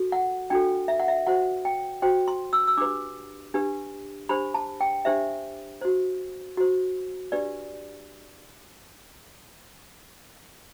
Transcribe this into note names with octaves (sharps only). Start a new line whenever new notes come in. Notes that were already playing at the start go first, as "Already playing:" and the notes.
Already playing: F#4 A4
F#5
D4 F#4 A4 G5
E5
F#5
E5
F#4 C5 F#5
G5
F#4 C5 G5
C6
E6
E6
D4 G4 B4 D6
D4 G4 B4
D4 G4 C5 B5
A5
G5
D4 G4 C5 E5
F#4 C5
F#4 C5
D4 G4 B4 D5